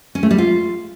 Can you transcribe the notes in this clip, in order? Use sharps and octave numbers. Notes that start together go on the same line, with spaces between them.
C#4
A3
G3
F4